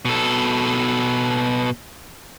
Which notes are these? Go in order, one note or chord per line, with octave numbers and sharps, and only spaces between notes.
B2 A4